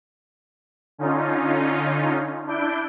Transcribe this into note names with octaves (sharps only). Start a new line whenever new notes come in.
D3 C#4 D#4 F4
D4 E4 G6 D7